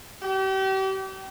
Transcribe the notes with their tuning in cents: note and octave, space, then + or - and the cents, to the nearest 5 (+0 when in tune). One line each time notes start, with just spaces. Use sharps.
G4 -35